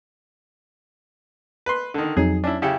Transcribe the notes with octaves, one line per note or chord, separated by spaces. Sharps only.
B4 C6
D3 D#3
F2 F#3 D#4 G#4
C#4 D4 E4
C#3 E4 G4 F5 C#7 E7